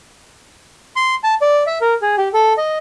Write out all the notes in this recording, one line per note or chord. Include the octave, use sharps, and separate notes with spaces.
C6
A5
D5
E5
A#4
G#4
G4
A4
D#5